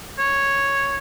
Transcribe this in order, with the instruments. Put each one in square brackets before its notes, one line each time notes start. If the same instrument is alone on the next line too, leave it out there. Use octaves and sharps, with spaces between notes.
[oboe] C#5